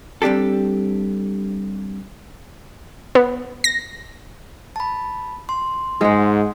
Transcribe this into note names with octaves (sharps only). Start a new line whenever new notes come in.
G3 C4 D4 G4 A4
B3
A#6
A5 B5
C6
G#2 G#3 F#5